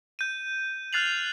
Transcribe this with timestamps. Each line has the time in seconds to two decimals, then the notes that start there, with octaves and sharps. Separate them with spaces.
0.19 G6 D#7
0.93 F6 F#6 A6 C7 F7 F#7